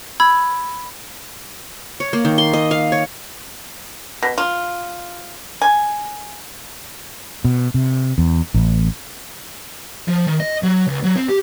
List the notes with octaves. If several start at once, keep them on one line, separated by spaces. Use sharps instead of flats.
B5 E6 G#6
C#5
A#3
D#3
C6
D#5
F5
C#5
B2
F4
G#5
B2
C3
E2
A1
F3
D#3
D#5
F#3
C#2
F#3
C4
G4